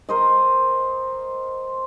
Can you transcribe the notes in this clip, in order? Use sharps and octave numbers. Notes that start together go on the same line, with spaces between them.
A#4 C5 D#5